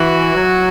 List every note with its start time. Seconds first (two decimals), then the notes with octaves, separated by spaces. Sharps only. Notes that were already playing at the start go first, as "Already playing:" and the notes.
Already playing: E3 F#4
0.35 F#3